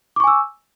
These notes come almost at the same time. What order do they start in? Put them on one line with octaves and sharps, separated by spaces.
D6 C#6 G#5 E6